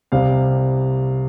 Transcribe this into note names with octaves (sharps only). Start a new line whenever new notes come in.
C2 C3 G3 C4 F5